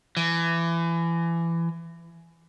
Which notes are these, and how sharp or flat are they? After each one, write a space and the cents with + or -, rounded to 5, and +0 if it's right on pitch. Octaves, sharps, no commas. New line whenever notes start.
E3 +25